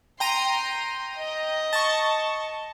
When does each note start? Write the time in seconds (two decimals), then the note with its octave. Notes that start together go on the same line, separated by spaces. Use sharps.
0.20 G5 A#5 C6 D#7
1.16 D#5
1.73 A5 C#6